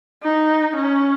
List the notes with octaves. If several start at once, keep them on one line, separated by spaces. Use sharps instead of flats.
D#4
C#4